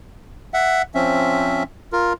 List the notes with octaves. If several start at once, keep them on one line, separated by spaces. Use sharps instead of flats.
E5 F#5
F3 C4 C#4 E5
F4 A#4